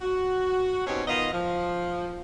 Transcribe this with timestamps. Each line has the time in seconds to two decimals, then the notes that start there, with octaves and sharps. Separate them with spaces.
0.01 F#4
0.86 B2 F#3 C4 C#4 D#4 G4
1.07 D#3 B3 F4 D#5
1.32 F3